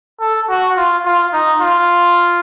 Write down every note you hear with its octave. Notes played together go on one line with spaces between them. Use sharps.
A4
F#4
F4
F4
D#4
F4